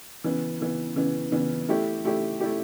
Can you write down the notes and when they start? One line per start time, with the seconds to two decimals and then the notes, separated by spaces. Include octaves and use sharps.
0.24 C#3 E3 B3
0.60 C#3 E3 B3
0.96 C#3 E3 B3
1.32 C#3 E3 B3
1.69 A3 E4 G4
2.04 A3 E4 G4
2.40 A3 E4 G4